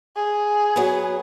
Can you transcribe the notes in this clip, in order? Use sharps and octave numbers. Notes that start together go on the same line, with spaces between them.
G#4
F#3 B3